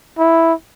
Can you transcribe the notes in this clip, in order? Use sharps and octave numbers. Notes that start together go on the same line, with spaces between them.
E4